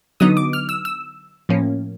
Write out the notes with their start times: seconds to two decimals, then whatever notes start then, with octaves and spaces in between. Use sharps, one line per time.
0.20 D3 F#3 B3 D#4 D#6
0.37 D6
0.53 F6
0.69 E6
0.85 E6
1.49 A2 F3 A#3 C#4